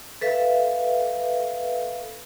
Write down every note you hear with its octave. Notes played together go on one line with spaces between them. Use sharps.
A4 B4 E5 F5